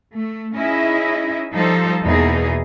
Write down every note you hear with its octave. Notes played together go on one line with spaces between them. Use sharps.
A3
C#4 D#4 E4 G#4 D#5 E5
F3 G3 D#4 A4 C5
E2 B2 E3 A#3 D#4 G#4